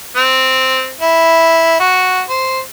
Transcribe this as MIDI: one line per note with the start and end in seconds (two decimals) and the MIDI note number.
0.16 0.90 60
1.01 1.78 64
1.80 2.22 66
2.30 2.60 72